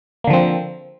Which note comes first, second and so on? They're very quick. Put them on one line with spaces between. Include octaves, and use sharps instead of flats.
A#3 D3 F3 C4